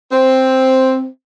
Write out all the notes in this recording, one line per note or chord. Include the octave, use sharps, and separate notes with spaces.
C4